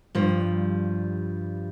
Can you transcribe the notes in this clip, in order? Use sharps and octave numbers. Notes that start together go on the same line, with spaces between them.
G2 F3 G3